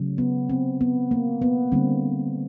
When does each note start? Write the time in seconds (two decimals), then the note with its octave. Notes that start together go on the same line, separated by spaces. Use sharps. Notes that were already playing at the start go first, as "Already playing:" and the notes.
Already playing: C#3 F#3 A3
0.18 B3
0.50 C4
0.81 B3
1.11 A#3
1.42 B3
1.72 D3 G3 A#3 C4